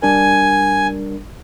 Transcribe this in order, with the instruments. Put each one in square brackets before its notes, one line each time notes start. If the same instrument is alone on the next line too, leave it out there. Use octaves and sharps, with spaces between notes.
[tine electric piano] G3 D4 A#4 [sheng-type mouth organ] G#5